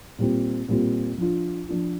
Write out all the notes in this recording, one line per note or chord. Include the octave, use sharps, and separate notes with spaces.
A#2 G3 C4 F4
A#2 G3 C4 F4
F3 D4 F4
F3 D4 F4